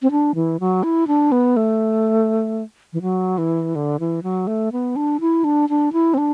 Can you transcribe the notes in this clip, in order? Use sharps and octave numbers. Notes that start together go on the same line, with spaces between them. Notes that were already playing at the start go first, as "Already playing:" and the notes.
C4
D4
E3
F#3
E4
D4
B3
A3
E3
F#3
E3
D3
E3
F#3
A3
B3
D4
E4
D4
D4
E4
C4
D4